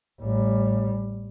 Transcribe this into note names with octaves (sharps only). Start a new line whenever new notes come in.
A1 G3